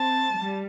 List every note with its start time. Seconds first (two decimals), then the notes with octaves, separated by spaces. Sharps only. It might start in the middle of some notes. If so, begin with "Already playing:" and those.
Already playing: C4 A5
0.35 G3